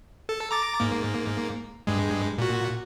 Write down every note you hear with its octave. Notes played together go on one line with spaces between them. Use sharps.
A4
A#5 D6 A6
G#2 A#3
G2 G#3
A#2 F#4